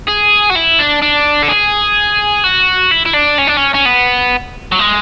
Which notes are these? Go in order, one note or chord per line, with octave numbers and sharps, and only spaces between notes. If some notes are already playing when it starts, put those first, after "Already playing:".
G#4
F#4
E4
D4
D4
A4
G#4
F#4
E4
E4
D4
C#4
D4
C#4
C#4
B3
F#3
G#3